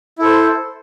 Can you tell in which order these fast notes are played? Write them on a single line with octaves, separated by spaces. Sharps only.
E4 A4 C5